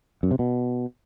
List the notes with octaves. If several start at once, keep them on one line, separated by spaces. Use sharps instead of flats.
F#2
C3
B2